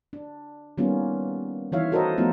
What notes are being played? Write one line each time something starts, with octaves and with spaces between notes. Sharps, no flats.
D4
D#3 G3 A#3 B3 C#4 F4
D#3 E3 F4 C#5 E5 F5
F#4 A4 A#4 C5 C#5 D#5
F3 F#3 A3 B3 D#4 F4